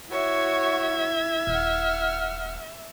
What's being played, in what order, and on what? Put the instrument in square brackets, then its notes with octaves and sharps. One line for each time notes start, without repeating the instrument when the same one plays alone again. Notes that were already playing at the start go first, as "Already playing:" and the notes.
[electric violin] E4 G#6 [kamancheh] F#4 C#5 [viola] E5
[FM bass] D#1 [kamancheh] F#5 F6